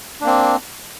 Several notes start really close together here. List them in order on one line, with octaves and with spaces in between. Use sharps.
D4 A#3 C4